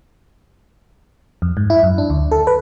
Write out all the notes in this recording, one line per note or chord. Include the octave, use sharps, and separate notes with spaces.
F2
G#2
E4
F#2
D4
D2
A4
B4